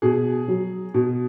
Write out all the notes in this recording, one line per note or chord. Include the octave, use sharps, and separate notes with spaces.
B2 G#4
F#3
B2